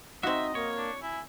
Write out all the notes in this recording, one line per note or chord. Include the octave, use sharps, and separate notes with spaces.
C4 D#4 F#4 D#5 E5
A#3 C#5
D4
E4 G#5